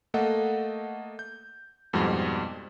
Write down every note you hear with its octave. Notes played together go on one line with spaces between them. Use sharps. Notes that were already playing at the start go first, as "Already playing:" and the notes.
A3 A#3 A4 D#5 F#5
G6
F2 G#2 B2 G3 G#3